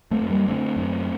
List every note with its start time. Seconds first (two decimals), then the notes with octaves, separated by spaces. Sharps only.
0.11 A3 C4
0.21 F#2
0.30 G3 A#3
0.48 D3 A3 C4
0.76 F#2